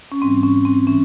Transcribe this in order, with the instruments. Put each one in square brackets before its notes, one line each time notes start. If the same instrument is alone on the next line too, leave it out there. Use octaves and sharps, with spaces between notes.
[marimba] C#4
G#2 E3 G3 C4
C#4
C4
A2 E3 G#3 C#4